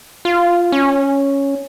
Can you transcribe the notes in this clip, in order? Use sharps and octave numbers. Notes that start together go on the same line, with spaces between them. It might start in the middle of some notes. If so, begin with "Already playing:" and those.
F4
C#4